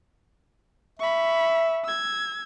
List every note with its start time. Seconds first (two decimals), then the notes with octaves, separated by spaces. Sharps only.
0.99 E5 B5 C#6
1.84 E6 G#6